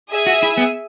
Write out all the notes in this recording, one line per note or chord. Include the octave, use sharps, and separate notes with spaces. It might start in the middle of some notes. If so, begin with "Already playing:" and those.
G#4 E5 G#5
F#4
E4
B3